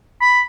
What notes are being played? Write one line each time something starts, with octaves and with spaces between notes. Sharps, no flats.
B5